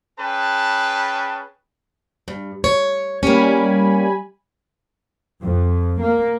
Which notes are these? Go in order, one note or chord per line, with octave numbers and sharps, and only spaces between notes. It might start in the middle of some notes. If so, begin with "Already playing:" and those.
C#4 G#4 B4 G5 A5
G2
C#5
G3 A#3 C#4 G#5 B5
F2
A#3